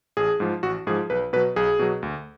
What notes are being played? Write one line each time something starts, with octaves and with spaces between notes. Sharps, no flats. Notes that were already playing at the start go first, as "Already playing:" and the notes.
A1 G#4
G#2 F3
A1 F#4
G#2 F3 G#4
B1 B4
B2 F#3 B4
B1 G#4
B2 F#3
D2